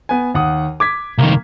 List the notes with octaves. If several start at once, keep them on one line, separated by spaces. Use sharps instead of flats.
B3 G#5
D#2 F#5 D#6
D6 G#6 B6
C2 D#3 A#3